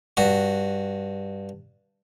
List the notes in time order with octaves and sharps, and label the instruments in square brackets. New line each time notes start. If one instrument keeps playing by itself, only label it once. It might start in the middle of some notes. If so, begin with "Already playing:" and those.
[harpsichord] G2 F#4